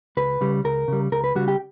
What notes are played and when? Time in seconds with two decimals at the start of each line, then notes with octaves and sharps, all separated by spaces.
0.17 C#2 B4
0.41 C#3 G3
0.64 C#2 A#4
0.88 C#3 G3
1.12 C#2 A#4
1.24 B4
1.35 C#3 G3 F#4
1.48 G4